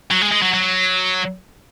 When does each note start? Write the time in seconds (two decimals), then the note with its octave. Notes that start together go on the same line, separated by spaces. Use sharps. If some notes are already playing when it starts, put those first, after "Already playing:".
0.11 F#3
0.22 G#3
0.32 G#3
0.42 F#3
0.54 F#3